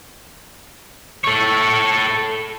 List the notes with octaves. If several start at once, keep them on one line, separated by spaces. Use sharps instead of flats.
A4 C#5